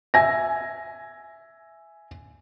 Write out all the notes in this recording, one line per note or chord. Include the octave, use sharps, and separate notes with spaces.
E5 G#5 A#6